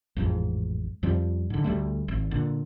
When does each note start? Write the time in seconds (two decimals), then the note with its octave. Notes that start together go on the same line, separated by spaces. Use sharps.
0.17 A1 F2 G#2
1.03 F2 F3 G3
1.50 G#2 D3
1.64 D2 G3 A3
2.08 G#1
2.31 A#2 D3